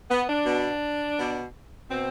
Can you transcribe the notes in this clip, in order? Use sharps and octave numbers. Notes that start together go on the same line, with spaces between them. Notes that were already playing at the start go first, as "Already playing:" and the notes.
B3
D4
B2
B2
B2 C4